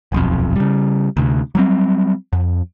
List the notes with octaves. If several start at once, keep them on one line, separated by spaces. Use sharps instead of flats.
D#1 B1 F2
C#3 G3
D2 C3
F#3 G3 C4
F2